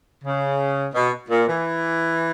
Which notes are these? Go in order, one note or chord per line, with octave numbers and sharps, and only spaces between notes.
C#3
B2
A#2
E3